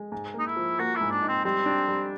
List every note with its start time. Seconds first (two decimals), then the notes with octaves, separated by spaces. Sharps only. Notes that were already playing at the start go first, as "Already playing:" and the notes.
Already playing: G#3
0.12 G#2
0.34 A#3
0.39 D#4
0.46 E4
0.56 F3
0.79 A#3 F#4
0.95 E4
1.01 G#2
1.11 D4
1.22 D#4
1.28 C4
1.44 G3 C4
1.66 D4
1.88 G3